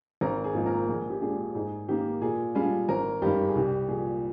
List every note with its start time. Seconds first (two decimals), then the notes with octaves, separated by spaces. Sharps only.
0.21 G#1 A#4
0.44 G#4
0.55 G#2 F3 A#3
0.66 A#4
0.88 A#1 G#4
1.10 G4
1.22 A#2 G#3 D4 G#4
1.55 G#2 G#4
1.89 D#3 A#3 G4
2.21 A#2 G#4
2.55 G3 D4 F4 G#4
2.89 G#1 A#4
3.22 G2 D#3 G3 G4
3.49 G#4
3.56 C2 G4
3.88 A#2 F3 G#4